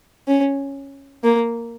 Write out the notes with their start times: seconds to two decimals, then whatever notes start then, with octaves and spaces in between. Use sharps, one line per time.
0.28 C#4
1.23 A#3